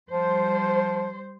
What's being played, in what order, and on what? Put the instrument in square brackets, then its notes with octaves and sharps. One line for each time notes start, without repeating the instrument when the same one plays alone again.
[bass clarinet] F3 [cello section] G3 C5